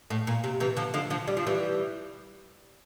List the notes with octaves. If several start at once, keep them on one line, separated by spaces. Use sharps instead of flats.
A2
A#2
C3
C3 E3
D3 F3
D3 F3
D3 F3
G3
F3
E3 G3